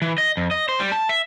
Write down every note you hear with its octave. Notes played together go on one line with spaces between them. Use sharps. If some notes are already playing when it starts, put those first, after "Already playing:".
E3
D#5
F2
D#5
C5
G3
A5
E5